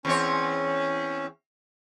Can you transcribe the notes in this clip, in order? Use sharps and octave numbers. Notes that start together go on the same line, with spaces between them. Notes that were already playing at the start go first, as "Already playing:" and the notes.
E2 C4 C#4 C#5